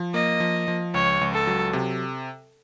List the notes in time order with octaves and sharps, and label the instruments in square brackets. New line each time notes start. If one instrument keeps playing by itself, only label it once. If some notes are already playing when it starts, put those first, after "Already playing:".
Already playing: [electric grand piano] F3
[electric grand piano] A#3 [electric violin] D#5
[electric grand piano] F3
F3
[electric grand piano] C#2 [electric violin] C#5
[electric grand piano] C#2
[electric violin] A4
[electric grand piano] F#3
C3